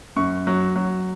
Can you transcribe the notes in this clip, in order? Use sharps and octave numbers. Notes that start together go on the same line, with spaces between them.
F#2 C#6
F#3
F#3